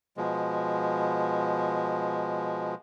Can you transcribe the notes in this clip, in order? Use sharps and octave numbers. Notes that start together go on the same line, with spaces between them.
B2 F3 G#3